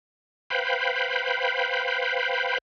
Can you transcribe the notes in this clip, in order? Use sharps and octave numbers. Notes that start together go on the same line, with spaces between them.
B4 C5 F5 G5 B5